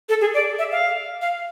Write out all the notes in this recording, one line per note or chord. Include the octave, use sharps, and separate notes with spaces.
A4
G#4
D5
E5
F5
F5